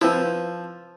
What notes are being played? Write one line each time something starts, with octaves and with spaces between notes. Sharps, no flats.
F3 C4 E4 B4 C5 E6